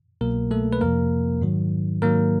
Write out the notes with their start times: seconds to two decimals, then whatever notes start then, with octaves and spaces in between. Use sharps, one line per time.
0.21 C2 B2 F#3 A#3 A#4
0.51 A3 A4
0.73 B4
0.81 F2 C3 F3 A#3 A#4
1.41 G#2 D#3 F#3
2.02 G#2 D#3 F#3 A#3 A#4